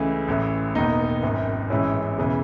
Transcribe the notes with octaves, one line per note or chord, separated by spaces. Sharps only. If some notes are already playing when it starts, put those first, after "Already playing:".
Already playing: C#2 C#3 E3 A3
A1 A2 E3
E1 D#2 D#3 B3 D#4
G#1 F#2 D#3
A1 G#2 E3 C#4 E4
E1 C#3 E3